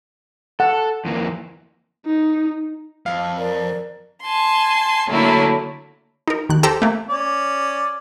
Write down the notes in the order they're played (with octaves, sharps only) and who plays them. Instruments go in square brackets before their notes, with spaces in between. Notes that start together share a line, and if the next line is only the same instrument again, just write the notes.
[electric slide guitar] A4 [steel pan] F#5
[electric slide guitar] F2 E3 A#3
[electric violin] D#4
[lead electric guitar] F2 [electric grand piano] F5
[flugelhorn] A#4 [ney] D5
[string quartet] G#5 A5 C6
D3 F#3 A3 A#3 E4
[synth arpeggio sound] D#4 A#4
D#2 F#6
G4 A4 C5 A#5 E6
A3 A#3
[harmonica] C#4 D5